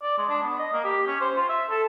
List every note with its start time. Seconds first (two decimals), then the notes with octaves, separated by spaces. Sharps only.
0.03 D5
0.18 G#3
0.29 D4
0.43 B3
0.59 D#5
0.73 A#3
0.84 G4
1.07 C#4
1.21 C5
1.36 F4
1.49 E5
1.70 A4